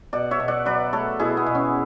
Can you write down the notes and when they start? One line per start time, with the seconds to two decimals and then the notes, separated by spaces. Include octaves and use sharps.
0.13 B2 D5 F#5
0.31 C#5 E5
0.40 B2
0.48 D5 F#5
0.65 F#3 B4 D5
0.93 A3 A4 C#5
1.19 B2 E4 G#4
1.37 B3
1.46 B2
1.55 C#4